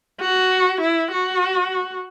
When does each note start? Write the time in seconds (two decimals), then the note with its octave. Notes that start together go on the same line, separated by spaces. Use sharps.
0.20 F#4
0.80 E4
1.12 F#4